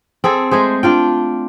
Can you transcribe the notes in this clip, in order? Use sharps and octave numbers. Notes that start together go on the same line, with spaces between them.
C4 G#4 A4
G#3 A3 G#4 C5
D4 F4 G5